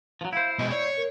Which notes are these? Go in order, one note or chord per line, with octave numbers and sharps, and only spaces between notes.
F3 F#3
E4 C5 F5
B2 G#3 D#5
C#5 D5
A#4